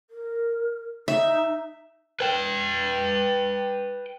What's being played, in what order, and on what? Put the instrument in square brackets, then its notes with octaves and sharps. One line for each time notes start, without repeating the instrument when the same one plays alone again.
[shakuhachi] A#4
[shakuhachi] D#4 [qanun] E5
[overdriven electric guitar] B4 G5